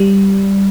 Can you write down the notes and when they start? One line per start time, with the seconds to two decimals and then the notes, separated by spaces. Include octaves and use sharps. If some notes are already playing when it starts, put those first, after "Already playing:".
Already playing: G3